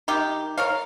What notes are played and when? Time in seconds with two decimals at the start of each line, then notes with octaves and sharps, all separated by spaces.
0.08 D#3 D#4 G4
0.58 A#4 C#5 F5